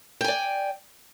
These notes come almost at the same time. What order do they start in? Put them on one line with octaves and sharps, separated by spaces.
G5 G#5 D5